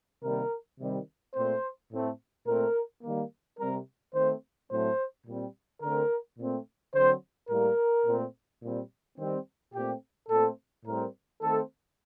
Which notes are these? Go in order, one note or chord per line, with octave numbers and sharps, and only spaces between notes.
C3 D#3 G3 A#3 A#4
C3 D#3 G3 C4
A#2 A3 C4 C5
A2 A3 C4
A#2 A3 C4 A#4
D#3 G3 A#3
C3 G3 C4 A#4
D#3 A3 C4 C5
A2 F#3 A3 C4 C5
A#2 G3 C4
D3 A3 C4 A#4
A#2 A3 C4
D3 F#3 C4 C5
A2 G3 A#3 A#4
A#2 A3 C4
A#2 G3 C4
D#3 G3 C4
A#2 A3 C4 G4
A#2 A3 C4 A4
A2 G3 C4 A#4
D#3 A3 C4 A4